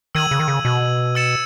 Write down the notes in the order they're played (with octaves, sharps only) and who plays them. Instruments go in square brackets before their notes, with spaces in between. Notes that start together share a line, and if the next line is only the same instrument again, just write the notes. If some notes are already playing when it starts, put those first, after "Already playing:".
[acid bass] D#3 [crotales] E6 G#6 D#7 F#7
[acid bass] C#3
D#3
C#3
B2
[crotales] E6 A6 C#7 E7